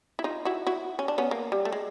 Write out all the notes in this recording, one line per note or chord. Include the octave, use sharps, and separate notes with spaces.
E4
D#4 F4
E4 F#4
E4 F#4
C#4
D4
B3 C#4
A#3
G3
A3
G#3